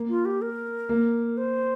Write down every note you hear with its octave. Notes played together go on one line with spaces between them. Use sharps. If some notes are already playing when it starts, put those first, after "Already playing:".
Already playing: A#3
F4
G4
A#4
A#3
C5